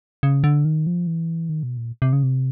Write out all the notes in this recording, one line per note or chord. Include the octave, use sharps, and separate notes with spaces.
C#3
D3
D#3
F3
E3
D#3
B2
A#2
C3
C#3
C3